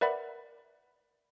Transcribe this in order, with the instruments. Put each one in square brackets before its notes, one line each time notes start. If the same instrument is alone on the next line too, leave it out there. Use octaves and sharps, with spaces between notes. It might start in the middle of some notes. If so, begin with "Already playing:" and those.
[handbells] A#4 B4 D5 E5 F#5 B5